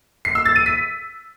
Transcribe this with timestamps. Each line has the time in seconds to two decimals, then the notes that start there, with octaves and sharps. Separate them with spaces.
0.25 C7
0.35 E6
0.46 A6
0.56 D#7
0.66 B6